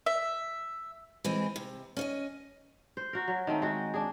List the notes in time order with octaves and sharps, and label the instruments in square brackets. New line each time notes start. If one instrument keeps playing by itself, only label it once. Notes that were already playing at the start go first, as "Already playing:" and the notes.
[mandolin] E5
[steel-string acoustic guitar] E3 G#3 C4
C3
C#4 C#5 D#5
[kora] C5
F#4 A#4
F#3 C#5
D#3 A3 C4
G#3 F#4
D4 G#4